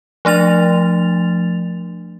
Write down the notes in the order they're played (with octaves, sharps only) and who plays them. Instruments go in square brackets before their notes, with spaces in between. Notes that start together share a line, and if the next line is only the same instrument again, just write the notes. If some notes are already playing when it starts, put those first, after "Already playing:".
[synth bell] F3 A3 D4 A6 F7